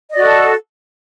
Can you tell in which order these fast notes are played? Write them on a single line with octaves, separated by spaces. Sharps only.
D#5 D5 F#4 A4